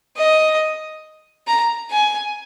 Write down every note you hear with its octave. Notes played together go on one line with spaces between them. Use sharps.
D#5
A#5
G#5